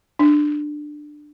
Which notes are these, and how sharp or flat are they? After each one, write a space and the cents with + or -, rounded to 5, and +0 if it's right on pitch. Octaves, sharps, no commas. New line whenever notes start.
D4 +15